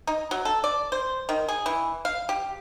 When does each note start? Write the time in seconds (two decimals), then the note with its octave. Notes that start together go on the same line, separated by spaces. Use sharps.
0.07 D#4
0.31 F#3
0.45 A4
0.64 D5
0.92 C5
1.29 D#3
1.48 G#4
1.66 E3
2.05 F5
2.29 G4